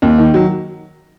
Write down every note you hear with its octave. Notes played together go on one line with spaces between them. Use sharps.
D#2
D#3
F#3